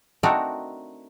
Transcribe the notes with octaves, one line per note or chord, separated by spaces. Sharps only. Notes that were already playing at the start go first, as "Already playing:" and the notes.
A3 C4 D4 D#4 F#4 A#4